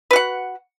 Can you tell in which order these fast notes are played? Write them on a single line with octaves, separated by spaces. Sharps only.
B4 F#4 F#5